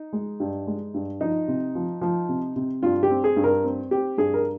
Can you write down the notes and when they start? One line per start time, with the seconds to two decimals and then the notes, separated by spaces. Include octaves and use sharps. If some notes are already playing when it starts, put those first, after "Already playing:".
Already playing: D#4
0.13 G#3
0.40 G2
0.67 G#3
0.94 G2
1.21 F3 D#4
1.48 C3
1.75 F3
2.01 F3
2.29 C3
2.56 C3
2.83 G2 F4
3.03 G4
3.10 C4
3.24 G#4
3.36 G2
3.44 A#4
3.64 C4
3.91 C4 G4
4.18 G2 G#4
4.34 A#4